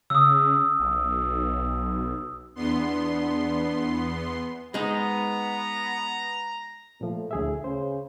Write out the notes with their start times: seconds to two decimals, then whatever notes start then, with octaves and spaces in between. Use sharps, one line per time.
0.10 C#3 D#6 E6
0.80 B1
2.56 E2 B3 D4 C6
4.74 G#3 B3 D#4 A#5
7.01 A#2 F3 A3
7.31 D2 A2 G#4 E5
7.64 C#3 C5